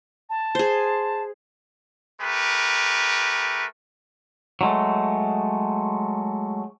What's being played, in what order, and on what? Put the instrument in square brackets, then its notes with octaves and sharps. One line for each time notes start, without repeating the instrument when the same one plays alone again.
[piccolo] A5
[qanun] G#4 C5
[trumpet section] A3 G4 A#4 B4
[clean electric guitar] F#3 G#3 A3